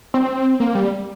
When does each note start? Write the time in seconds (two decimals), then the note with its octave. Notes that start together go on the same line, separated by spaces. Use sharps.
0.14 C4
0.60 A#3
0.75 G3